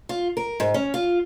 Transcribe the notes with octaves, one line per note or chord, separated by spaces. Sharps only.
F4
A#4
G#2
C#4
F4